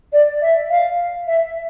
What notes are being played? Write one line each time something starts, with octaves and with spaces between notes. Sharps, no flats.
D5
E5
F5
E5